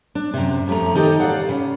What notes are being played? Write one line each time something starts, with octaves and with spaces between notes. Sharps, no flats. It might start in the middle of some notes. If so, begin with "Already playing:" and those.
D4
F#2 A2 C3
F2 C3 F3 A3 A#5
D#3 D#4 G4 A4 D5 D#5
D5 F5 F#5
C#3